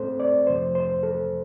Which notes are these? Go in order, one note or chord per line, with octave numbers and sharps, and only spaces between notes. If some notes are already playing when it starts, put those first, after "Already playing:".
Already playing: A2 A3 C4 A4 C5
D5
F2 C3 F3 A3 C5
C5
A4